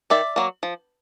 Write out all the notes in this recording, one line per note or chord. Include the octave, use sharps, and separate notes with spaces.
D#3 D5 E5
F#3 A#3
F3